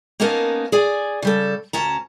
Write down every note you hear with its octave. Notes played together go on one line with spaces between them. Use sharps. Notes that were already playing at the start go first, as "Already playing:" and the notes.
A#3 B3 C#4 D#4 A#4 A5
G#4 D5 G#5
C#3 G3 A4
D2 C#4 A5 A#5